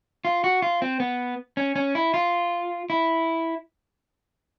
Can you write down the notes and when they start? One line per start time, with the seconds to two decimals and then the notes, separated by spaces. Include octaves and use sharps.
0.25 F4
0.44 F#4
0.62 F4
0.82 C4
1.00 B3
1.57 C#4
1.76 C#4
1.95 E4
2.14 F4
2.90 E4